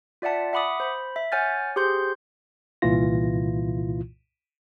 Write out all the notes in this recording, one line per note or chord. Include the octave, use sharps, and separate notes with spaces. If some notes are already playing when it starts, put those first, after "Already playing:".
F4 D5 E5 F#5 A5
E5 F#5 B5 D6 D#6
C5 B5
E5
C#5 F#5 G#5 F6 G6 A6
G4 G#4 C5 C6 G6
C2 A#2 E3 E4 F4 A#6